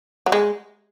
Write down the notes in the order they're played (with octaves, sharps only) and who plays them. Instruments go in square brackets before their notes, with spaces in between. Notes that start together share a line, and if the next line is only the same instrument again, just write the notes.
[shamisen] F#3
G#3